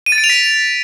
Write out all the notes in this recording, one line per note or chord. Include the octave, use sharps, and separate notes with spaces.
D#7
A6
D7
F7
B6